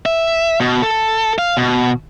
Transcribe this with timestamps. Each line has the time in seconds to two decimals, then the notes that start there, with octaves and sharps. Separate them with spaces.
0.06 E5
0.60 B2
0.82 A4
1.38 F5
1.57 B2